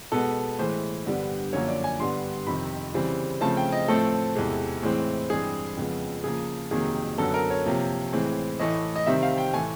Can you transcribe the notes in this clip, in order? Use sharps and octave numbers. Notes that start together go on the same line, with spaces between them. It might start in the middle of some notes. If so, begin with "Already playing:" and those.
B2 G#3 B3 A4
A2 E3 G#3 C5
G2 D3 G3 B3
F#2 D3 F3 A#3 C#5
D5
G#5
G2 D3 G3 B3 C6
F2 C3 D#3 B5
C#3 E3 G3 C4
C#3 F3 A3 C4 A5
G5
D#5
A2 F3 A3 C4 A4
E2 C3 E3 G#3
A2 E3 G#3 C4
G2 E3 G#3 C4 G#4
F2 C#3 F3 G#3 B3
C#3 F3 A#3 G#4
F2 C3 D#3 F#3 A#3 G#4
F#2 D3 F#3 B3 A4
A#4
C#5
C3 F3 A#3
A2 E3 G#3 C4
A2 E3 A3 D#5
D#5
C3 D#3 G3 C4 E5
F5
G5
A2 E3 A3 G#5